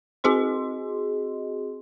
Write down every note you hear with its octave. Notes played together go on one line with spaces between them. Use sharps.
C4 F#4 G#4 D#5 C6